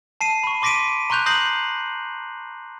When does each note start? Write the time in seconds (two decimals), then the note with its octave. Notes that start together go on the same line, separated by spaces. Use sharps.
0.21 A5 C7 D#7
0.43 B5 C#6
0.62 C6 D6 A#6 B6 D7 D#7
1.10 A#5 C6 C#6 F#6 G6 F7
1.26 D#6 G6 A#6 C7 F#7